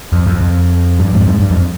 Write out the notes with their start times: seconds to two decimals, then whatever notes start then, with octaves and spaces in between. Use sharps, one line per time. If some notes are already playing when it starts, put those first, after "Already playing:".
0.13 F2
0.27 F2
0.41 F2
0.99 G2
1.13 F2 G#2
1.29 G#2
1.40 G2
1.50 F2